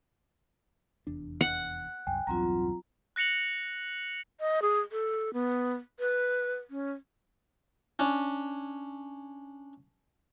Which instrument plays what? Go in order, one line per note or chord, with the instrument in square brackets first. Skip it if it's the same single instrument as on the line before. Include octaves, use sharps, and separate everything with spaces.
[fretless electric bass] F1 E2 D4
[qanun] F#5
[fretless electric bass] C2 F#2 [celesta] G5 G#5
[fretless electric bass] B1 E2 G2 [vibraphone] F#3 C4 F4 [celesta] A#5
[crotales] F#6 A#6 C#7 F7 F#7
[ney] D#5
G#4
A4
B3
B4
C#4
[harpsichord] C#4 D4